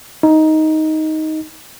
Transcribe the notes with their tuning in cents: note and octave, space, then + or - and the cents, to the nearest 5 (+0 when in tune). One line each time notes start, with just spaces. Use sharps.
D#4 +10